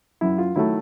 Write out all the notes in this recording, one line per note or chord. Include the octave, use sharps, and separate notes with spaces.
F#2 E4
F4
D#3 F#3 A3 E4